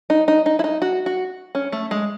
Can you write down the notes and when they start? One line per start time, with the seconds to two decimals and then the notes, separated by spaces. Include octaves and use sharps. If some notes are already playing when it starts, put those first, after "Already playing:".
0.10 D#4
0.28 D#4
0.46 D#4
0.59 E4
0.64 D#4
0.82 F#4
1.06 F#4
1.55 C#4
1.72 A3
1.91 G#3